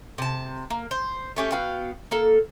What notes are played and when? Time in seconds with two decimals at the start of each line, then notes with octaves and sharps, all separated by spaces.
0.18 C3 A5
0.70 A#3
0.91 C5
1.36 A3 C#4 G4
1.52 B3 F#4 F5 G5
2.11 A#3 A4